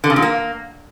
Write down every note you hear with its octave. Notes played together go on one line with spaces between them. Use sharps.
D3
C#3
A#2
A#3